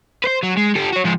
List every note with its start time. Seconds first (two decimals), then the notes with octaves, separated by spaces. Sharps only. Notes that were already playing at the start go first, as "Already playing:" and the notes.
0.24 B4 C5
0.43 F#3
0.57 G#3
0.75 G4 A4
0.92 F#4 C#5
1.05 F3 G#3